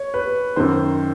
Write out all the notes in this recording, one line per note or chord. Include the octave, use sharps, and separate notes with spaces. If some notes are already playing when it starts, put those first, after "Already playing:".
Already playing: C#5
B4
F#2 D#3 C5